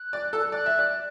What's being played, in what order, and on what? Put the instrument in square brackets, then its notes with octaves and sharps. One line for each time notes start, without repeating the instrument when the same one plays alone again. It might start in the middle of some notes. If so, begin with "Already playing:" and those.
Already playing: [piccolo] F#6
[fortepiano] D5
A4
[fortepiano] D5 [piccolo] F#6
[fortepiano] E5
D5